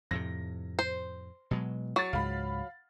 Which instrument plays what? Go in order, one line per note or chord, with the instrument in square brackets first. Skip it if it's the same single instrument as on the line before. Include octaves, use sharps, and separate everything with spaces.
[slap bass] F2 A2 C3 [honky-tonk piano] A#6
[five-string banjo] C5
[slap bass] B2 F#3 G#3
[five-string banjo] F#3 [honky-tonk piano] C#6 A6
[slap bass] C#2 G#2 [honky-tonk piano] F5 B5